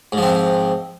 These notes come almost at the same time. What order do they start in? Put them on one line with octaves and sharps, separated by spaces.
G#2 F3 C4